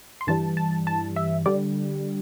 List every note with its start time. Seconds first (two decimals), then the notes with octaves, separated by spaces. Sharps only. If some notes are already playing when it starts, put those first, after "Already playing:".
0.21 C6
0.27 G2 E3 G3 A5
0.57 A5
0.87 A5
1.16 E5
1.46 D3 G3 D5